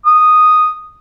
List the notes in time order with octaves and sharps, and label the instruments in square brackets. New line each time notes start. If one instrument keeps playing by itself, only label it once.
[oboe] D#6